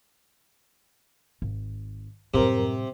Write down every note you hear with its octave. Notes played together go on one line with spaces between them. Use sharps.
G#1
F#2 A2 C3 G3 A#4